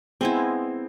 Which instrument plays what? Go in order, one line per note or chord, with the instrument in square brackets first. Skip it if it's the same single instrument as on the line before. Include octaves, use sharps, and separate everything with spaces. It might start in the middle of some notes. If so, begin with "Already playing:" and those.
[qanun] G#3 B3 E4 [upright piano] C4